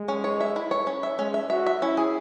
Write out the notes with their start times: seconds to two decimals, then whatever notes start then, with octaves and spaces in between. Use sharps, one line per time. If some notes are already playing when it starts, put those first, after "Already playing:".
Already playing: G#3
0.08 C#4
0.24 C#5
0.40 E5
0.56 E4
0.71 C#5
0.87 C#4
1.03 E5
1.19 G#3 C#4
1.34 E5
1.50 F#4 E5
1.66 E5
1.82 C#4 E4
1.97 G#4